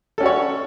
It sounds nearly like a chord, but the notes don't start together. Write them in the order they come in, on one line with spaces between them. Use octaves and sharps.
A4 C#4 F#4 C#5